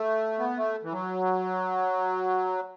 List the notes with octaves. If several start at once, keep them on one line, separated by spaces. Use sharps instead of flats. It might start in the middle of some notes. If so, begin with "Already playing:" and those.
Already playing: A3
B3
A3
E3
F#3